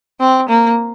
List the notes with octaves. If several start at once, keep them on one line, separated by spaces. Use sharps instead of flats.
C4
A#3